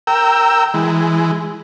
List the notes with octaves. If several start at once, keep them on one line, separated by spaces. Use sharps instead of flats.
A#4 G5 E6
E3 G#3